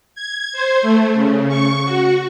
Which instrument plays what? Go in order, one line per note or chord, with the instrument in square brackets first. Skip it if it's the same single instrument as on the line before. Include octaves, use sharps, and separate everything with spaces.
[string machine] G#6
C5
A3
C#3
C#6
F#4